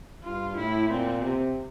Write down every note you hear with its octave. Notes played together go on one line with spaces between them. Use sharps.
G2 F4
A2 E4
A#2 C4
C3